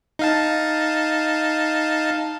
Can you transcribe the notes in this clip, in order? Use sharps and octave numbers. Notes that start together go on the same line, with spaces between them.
D#4 F5 A5